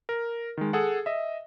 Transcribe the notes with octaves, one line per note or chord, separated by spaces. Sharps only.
A#4
D#3 G#3
G#4 A4 F#5
D#5 E5